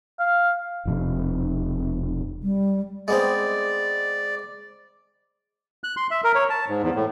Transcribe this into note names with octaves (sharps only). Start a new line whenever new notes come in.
F5
E1 F2 C3
G3
G#3 B3 C4 D5
F#6
C6
E5
A#4
C#5
A5
G#2
E2
A2